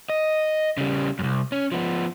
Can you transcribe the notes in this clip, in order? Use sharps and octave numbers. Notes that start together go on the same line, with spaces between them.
D#5
C#3 G3
C2 F#2
C#4
F3 B3